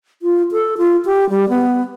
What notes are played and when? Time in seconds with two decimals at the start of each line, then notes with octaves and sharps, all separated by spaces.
0.22 F4
0.52 A4
0.78 F4
1.05 G4
1.30 G3
1.49 B3